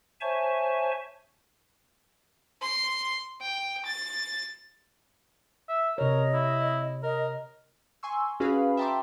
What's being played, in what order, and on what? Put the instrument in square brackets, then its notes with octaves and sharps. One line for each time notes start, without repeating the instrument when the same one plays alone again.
[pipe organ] C5 C#5 E5 G#5 A5 C#6
[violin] C6
G5
A6
[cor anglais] E5
[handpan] C3 C#5 [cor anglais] A#4 [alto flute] D#5
[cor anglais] E4
[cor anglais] A#4 [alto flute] D#5
[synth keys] G#5 C6 C#6 E6
C#4 F#4 G#4 B4 F5 B5
E5 G5 A5 A#5 C6 D6